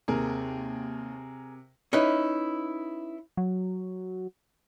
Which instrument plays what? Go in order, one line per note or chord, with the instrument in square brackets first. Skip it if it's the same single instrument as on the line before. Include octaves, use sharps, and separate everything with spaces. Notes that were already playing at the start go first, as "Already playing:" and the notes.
[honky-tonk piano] D#2 [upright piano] C3 [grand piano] G#4 A#4
[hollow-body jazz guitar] C#4 D#4 E4 B4
[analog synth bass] F#3